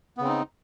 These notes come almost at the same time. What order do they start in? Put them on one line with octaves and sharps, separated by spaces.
B3 C#3 C4 D#4